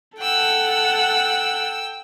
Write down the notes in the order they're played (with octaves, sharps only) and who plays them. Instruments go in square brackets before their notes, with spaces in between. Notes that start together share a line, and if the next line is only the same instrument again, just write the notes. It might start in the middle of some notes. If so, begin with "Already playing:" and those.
[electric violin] A4 F#5 [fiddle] G5 E6